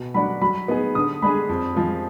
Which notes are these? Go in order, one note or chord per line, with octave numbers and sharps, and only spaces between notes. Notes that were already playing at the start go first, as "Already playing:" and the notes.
Already playing: B2
F#3 D4 F#4 D5 B5
F#3 B5
B3 D#4 G#4
D3 D#6
G#3 D4 G#4 B5
F2
F3 G#3